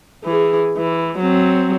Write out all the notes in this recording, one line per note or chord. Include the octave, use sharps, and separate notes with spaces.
E3 G#4
E3
F#3 C4